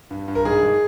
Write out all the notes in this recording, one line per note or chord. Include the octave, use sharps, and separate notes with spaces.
G2
G2
A#4
G#2 G#4
G#2